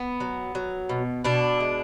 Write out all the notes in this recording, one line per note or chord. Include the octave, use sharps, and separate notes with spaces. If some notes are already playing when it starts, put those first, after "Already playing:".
Already playing: B3
F#3
F#3
B2
B2 D4
G#3